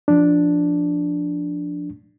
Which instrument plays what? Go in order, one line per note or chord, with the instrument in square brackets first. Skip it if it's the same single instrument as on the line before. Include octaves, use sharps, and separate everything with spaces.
[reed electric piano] F3 D4